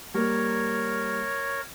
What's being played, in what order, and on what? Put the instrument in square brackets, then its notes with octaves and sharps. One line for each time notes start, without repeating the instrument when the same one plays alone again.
[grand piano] G3 A#3 [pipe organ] A#4 C#5